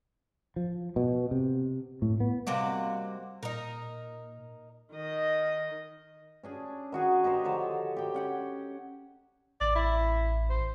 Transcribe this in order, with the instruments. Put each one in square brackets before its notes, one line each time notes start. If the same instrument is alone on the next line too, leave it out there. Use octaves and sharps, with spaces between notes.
[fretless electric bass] F3
B2
C3
A2
B3
[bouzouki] C3 A#3 F#4 [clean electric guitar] G3 D#5
[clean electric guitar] A#2 [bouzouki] D#4 A#4
[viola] D#3 D#5
[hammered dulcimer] C#4 D4 G#4
D#3 F#4 G#4 C#6
D#4 G4 A#4 C5
D3 F3 C#5 A5
G4 G5
C#4 F#5 G5
[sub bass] A1 [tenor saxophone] D5
[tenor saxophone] E4
C5